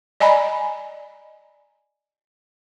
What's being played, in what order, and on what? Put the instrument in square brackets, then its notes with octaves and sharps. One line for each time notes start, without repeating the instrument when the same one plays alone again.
[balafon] D5 D#5 G#5 A#5 B5